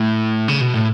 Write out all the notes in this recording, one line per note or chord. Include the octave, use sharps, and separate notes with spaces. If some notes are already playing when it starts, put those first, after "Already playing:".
Already playing: A2
C#3
B2
A2